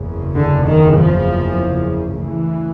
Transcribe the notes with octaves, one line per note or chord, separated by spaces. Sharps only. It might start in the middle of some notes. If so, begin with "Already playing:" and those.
Already playing: F#1 E2 C#3
D3
D#3
F3
D2 C#3 E3